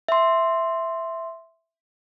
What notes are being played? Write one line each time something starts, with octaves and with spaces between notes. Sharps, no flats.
E5 C6